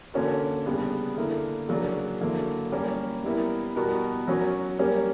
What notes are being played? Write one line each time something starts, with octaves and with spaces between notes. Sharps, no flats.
D3 A#3 C#4 F#4 A#4
C#3 G3 B3 D4
D3 A#3 E4 A#4
C#3 F#3 A#3 D4
D3 F#3 A#3 E4
G3 A#3 C#4 G4 A#4
G3 B3 E4 A#4
B2 G3 B3 F#4 A#4
F#3 C#4 F#4 A#4
G3 A#3 C#4 G4 A#4